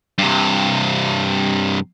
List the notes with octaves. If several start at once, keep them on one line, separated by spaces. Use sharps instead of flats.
G2 C3